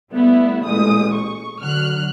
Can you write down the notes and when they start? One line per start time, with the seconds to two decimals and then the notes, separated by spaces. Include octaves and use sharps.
0.12 G3 A3 B3 E4
0.65 A1 A#2 G#3 D#6
1.13 C#6
1.61 D3 F#3 F6 F#6